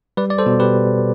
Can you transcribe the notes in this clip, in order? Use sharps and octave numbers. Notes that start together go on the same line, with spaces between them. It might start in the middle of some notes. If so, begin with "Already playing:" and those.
G3 B4 D5
D5
A4 C5
B2
G4 B4